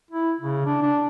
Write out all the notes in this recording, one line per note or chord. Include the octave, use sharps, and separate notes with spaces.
E4
C#3
D4
D4